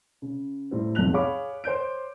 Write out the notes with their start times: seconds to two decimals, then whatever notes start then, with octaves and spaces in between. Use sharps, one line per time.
0.22 C#3
0.71 A2 C3 G3 C4
0.95 B1 F2 C3 F#6 F7
1.13 G#4 C#5 F5 B5 C#6 D6
1.64 C5 C#5 G6 D7